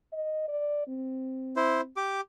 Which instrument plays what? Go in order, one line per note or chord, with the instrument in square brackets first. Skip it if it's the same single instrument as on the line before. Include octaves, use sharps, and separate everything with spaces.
[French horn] D#5
D5
C4
[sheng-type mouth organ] E4 C5
G4 D6